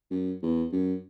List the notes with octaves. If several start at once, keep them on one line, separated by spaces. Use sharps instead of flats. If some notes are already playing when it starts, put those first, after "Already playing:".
F#2
E2
F#2